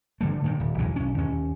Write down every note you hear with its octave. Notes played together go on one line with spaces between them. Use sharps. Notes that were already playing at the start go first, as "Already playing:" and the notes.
D3 G3 A3
A#2 D3 D#3 G3
D#1
B1 E2 A2 E3
B1 C#4
D#2 C#4